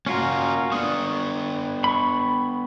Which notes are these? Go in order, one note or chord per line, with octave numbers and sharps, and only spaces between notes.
A#3 C#4 F4 F#4 A#4
B3 D4 C#6 D#6
B5 C#6